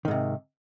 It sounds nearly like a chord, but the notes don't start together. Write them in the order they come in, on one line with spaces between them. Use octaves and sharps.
D#3 G#2 C3